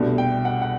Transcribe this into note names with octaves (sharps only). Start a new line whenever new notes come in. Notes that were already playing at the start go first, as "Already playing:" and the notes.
Already playing: C2 B2 A3 D4
G5
F#5
F#5